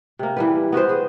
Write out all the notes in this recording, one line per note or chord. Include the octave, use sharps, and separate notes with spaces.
C3 A#3
E3 G3 B4
B3 F#4 B4 C5
G#4